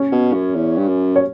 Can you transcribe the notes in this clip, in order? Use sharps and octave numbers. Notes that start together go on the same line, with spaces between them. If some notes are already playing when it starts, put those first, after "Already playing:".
Already playing: C#4 C#5
B2
F#2
E2
G2
F#2
C#5